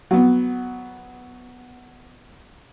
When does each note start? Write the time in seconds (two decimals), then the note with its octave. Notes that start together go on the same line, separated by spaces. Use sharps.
0.11 F#3 B3